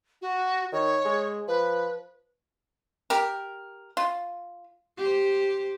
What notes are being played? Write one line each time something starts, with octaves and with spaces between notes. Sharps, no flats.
F#4
D#3 C#5
G#3
F3 B4
G4 A#4
F4
G4 C5